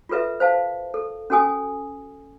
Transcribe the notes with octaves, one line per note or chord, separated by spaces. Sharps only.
F4 F#4 A4 B4 E5
C5 F5 A5
A4
C#4 F#4 A4 G#5 D#6